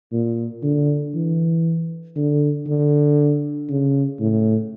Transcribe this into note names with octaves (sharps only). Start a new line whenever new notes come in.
A#2
D3
E3
D3
D3
C#3
A2